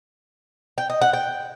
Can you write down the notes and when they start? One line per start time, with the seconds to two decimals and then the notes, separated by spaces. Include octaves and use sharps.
0.78 G5
0.90 D#5
1.01 F#5
1.13 G5